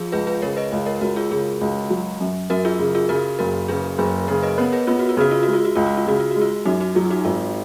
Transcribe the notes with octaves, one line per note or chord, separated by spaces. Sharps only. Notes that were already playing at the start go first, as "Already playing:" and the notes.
Already playing: F3 F4 G#4
C#2 G#4 B4
G#4 B4
C#3 A#4 C#5
B4 D#5
C#2
A#4 C#5
C#2 F#4 A#4
F4 G#4
C#3 F4 G#4
C#2
F#3
F#2
F#2 F#4 A#4
F4 G#4
C#3
F4 G#4
C#3 F#4 A#4
F#1 F#4 A#4
C#3 G#4 B4
F#1 G#4 B4
C#3 A#4 C#5
B4 D#5
B3 A#4 C#5
G#4 B4
B3 F4
F#4
F4
C#3 F#4
F4
G#3 F#4
F4
F#4
C#2 F4
F#4
F4
C#3 F#4
F4
G#3 F#4
F4
F#2 D#4 F#4
D#4 F#4
F#3 F4 G#4
D#4 F#4
G#1 F4